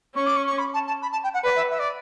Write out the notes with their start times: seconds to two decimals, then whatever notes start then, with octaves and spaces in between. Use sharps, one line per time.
0.15 C#4 C#6
0.26 D6
0.36 C#6
0.46 C#6
0.58 B5
0.73 A5
0.87 A5
1.02 B5
1.12 A5
1.23 G5
1.33 F#5
1.44 B4 D5
1.55 E5
1.70 E5
1.79 D5